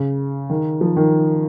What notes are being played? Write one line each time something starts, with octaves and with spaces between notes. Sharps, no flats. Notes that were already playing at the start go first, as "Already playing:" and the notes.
Already playing: C#3
D#3
F3
D#3